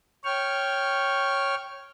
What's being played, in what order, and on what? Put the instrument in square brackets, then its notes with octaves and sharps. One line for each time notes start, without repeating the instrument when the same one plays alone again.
[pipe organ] C#5 G5 C#6 F6